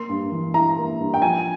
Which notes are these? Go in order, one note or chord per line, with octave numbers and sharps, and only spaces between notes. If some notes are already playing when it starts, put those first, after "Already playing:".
Already playing: A#3 C6
G2
E3
E4 A#5
A#3
G2
G5
F3 G#5